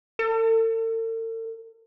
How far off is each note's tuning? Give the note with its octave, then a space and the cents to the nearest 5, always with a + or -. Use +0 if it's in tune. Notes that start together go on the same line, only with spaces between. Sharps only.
A4 +45